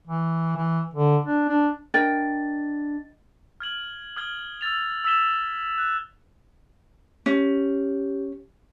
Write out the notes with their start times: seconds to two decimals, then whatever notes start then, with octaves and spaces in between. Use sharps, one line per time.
0.07 E3
0.56 E3
0.94 D3
1.24 D4
1.48 D4
1.94 D4 A#4 D#5 G5 A6
3.60 F6 G#6 F#7
4.16 D#6 F6 G#6 G7
4.61 E6 F6 A6 F7
5.04 E6 G#6 B6 E7 G7
5.78 F#6
7.26 C#4 G4